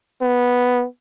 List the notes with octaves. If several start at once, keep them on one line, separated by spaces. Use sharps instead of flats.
B3